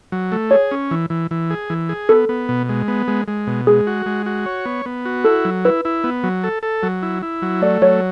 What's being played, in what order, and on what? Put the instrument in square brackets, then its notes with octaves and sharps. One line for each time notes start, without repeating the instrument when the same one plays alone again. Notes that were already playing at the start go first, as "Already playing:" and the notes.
[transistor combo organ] F#3
A3
[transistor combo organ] G#4 [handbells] C#5
[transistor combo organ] C#4
E3
E3
E3
G#4
E3
G#4
[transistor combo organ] B3 [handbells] A4
[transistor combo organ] B3
B2
G#3
B3
G#3
G#3
B2
[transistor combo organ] G#3 [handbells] G#4
[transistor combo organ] F#4
G#3
F#4
C#5
B3
B3
F#4
[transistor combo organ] E4 [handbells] A4
[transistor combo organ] F#3
[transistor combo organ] E4 [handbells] B4
[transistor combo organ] E4
B3
F#3
A4
A4
F#3
E4
E4
F#3
[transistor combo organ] A3 [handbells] D5
[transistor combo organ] F#3 [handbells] C#5